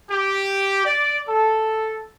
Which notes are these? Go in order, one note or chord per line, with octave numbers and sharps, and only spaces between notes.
G4
D5
A4